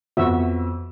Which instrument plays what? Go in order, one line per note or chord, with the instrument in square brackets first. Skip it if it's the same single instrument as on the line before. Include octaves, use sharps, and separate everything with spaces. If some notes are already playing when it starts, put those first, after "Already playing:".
[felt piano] F2 B3 E6 [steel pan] F#4 E5